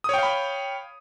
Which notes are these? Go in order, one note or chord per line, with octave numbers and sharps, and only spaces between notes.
C#5 F5 G5 B5 D#6